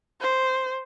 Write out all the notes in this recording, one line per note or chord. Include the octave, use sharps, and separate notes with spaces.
C5